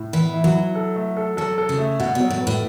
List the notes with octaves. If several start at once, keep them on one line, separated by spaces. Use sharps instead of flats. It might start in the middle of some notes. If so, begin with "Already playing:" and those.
Already playing: A2
E3 B3
E4
F#3
E4
A4
A3
A4
F#3 A4
A4
C#3
A3
B2 F#4
B2
F#3
A2
B3
A2